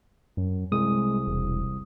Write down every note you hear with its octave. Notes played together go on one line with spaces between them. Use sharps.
F#2
C2 G#3 D#6
E1